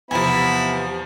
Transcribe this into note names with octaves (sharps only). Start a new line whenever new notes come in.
E2 C3 F3 B3 E4 G#5 B5